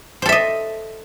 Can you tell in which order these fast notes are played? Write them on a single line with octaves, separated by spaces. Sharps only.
C5 A4 E5 D#5